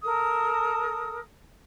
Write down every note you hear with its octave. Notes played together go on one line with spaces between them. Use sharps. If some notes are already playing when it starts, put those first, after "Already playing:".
A4 A#4 D#6